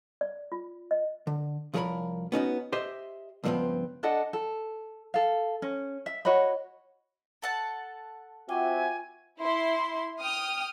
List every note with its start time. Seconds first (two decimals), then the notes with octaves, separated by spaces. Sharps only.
0.21 D5
0.52 F4
0.91 D#5
1.27 D3
1.74 C2 F3 G#4 A#4 C#5 B5
2.32 B3 C#4 D#4 F#4
2.72 G4 C5 D#5 E5
3.44 C#2 G2 F3 G#3 B3 C4
4.03 D4 A4 D#5 F#5
4.33 A4
5.14 A4 F5
5.62 C#4
6.06 E5
6.25 F#4 C#5 D#5 B5
7.42 A4 F#5 A5
8.49 C4 F4 F#4 E5 G5 G#5 D6
9.39 E4 C6
10.19 G5 D#6 F6